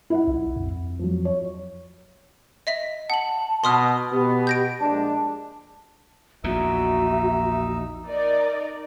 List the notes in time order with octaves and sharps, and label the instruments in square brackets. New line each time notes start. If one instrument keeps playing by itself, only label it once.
[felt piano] E4 E5 F#5
[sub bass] B1
F2
[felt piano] F3 F#3
C#5
[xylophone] D#5 E5 B6
[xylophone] F#5 F#7 [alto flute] A5
[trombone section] B2 [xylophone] C6 D#6 F6
[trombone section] B2 B3 [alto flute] G4
[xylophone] G6 A#6 D7
[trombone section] A#1 G#3 D4 [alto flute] A5
[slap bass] A#1 E2 A#2 [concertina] D#4 E6 [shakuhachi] F#4 [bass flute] E5
[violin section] D#4 A#4 D5